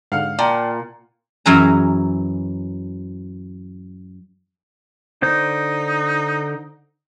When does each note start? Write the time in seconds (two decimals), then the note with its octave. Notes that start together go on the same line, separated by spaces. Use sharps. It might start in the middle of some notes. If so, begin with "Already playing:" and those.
0.12 G#2 D3 F5 F#5 F6
0.39 A#2 D5 G5 A5
1.46 F#2 E3 F#3 G#4 A#5
5.22 D3 D#4 C5 G6